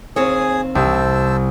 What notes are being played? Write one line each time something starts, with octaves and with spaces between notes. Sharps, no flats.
D#2 C4 G#4 C#5 G#5 D#6
C2 C5 A5 E6